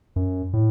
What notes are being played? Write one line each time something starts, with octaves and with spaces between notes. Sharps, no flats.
F#2
A2